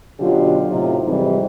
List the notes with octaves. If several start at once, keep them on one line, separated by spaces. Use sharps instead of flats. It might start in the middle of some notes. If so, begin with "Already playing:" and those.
B2 D3 F#3 C#4 F4 G4
A2 C3 F#3 D#4 F4
F2 G#2 C3 E3 G3 C4